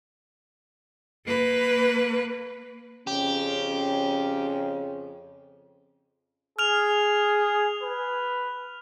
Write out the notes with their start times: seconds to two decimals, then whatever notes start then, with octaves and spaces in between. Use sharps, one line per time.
1.27 A#3 B4
3.07 F2 C#3 C#4 G4
6.59 G#4 F6 F7
7.83 B4